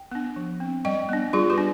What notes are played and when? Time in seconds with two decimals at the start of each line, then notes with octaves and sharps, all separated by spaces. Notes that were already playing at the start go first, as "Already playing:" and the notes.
Already playing: G5
0.12 B3 D4
0.36 F3
0.60 C4
0.85 G3 D#5 G5
1.09 B3 D4
1.33 G3 F4 G#4
1.50 G4 B4
1.58 D4